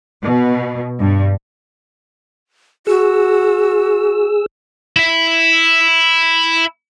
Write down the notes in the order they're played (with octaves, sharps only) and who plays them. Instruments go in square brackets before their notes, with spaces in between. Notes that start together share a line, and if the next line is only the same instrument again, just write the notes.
[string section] B2
G2
[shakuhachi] F#4 [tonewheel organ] G#4 E6
[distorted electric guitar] E4 E5